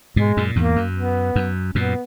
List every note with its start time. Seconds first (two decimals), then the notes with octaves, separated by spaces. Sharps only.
0.16 G#2 B2 G#3
0.37 F#2 A#2
0.56 E2 G#2 A#3
0.76 F#2
0.95 B3
1.36 F#2
1.75 F#2 A#2 B3